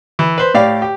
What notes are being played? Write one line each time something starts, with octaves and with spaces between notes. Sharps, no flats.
E3
B4 C5
A2 G4 D5 F5
G4